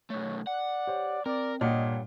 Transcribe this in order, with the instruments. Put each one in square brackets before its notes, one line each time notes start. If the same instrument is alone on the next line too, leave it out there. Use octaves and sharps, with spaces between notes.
[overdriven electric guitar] B1 A3 [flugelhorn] C#5
[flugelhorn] D5 [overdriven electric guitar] F#5
[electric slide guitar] G4 C5 C#5
[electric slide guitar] C4 [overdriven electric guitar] A#4 [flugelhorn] D5
[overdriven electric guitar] G2 [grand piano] A#2 [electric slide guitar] C#5 F#5 G5 [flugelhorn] D#5